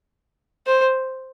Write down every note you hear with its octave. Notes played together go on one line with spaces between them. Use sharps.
C5